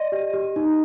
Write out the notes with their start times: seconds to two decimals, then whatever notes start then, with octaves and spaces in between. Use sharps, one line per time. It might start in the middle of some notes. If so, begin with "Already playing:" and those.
Already playing: D5 D#5 C6
0.12 G4
0.34 G4
0.56 D#4